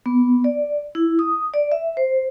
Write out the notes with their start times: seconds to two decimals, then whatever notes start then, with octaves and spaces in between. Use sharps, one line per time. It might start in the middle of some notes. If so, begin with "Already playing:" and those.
0.06 B3
0.44 D5
0.95 E4
1.19 D#6
1.54 D5
1.72 E5
1.97 C5